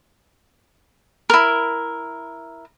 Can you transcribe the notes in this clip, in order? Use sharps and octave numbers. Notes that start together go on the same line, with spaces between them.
E4 A#4